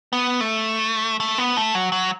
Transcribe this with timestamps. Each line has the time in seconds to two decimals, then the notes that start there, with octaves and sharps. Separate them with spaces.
0.13 B3
0.41 A3
1.20 A3
1.38 B3
1.57 A3
1.75 F#3
1.92 F#3